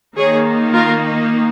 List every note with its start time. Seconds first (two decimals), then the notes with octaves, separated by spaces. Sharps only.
0.17 D#3 A#3 D#4 G#4 C#5
0.73 F4 A#4